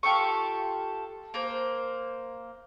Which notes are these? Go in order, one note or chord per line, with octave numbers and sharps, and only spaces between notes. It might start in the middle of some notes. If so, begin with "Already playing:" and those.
F4 G4 A4 C#6
A#3 C5